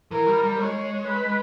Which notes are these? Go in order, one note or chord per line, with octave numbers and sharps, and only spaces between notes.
E3 A#4
G3
G3
G#3 C#5
B4